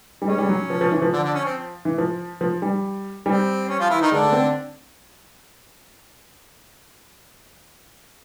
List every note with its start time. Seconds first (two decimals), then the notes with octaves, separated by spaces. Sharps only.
0.22 G3
0.27 G#3 C#4
0.38 G3
0.49 F#3
0.70 F3
0.81 F3
0.92 E3
1.02 F3
1.13 D3 D4
1.23 D3 D4
1.34 C#4
1.45 C4
1.85 E3
1.98 F3
2.41 F3
2.62 G3
3.26 G3 C4
3.69 C#4
3.79 F3 F4
3.90 E3 E4
4.01 D#3 D#4
4.11 D3 G#3 D4
4.22 A3
4.32 C4